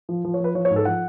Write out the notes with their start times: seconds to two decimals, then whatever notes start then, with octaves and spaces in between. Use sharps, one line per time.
0.09 F3
0.25 F3
0.34 C#5
0.40 F3 B4
0.55 F3 C#5
0.65 C#5
0.70 G#2
0.76 A4
0.85 F3 F#5